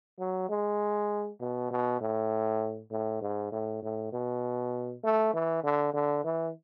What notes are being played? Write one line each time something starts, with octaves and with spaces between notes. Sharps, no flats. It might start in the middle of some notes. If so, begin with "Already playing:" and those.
F#3
G#3
B2
B2
A2
A2
G#2
A2
A2
B2
A3
E3
D3
D3
E3